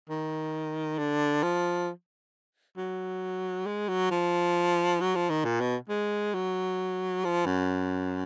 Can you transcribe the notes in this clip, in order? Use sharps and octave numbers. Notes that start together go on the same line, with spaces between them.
D#3
D3
F3
F#3
G#3
F#3
F3
F#3
F3
D#3
A#2
B2
G#3
F#3
F3
F#2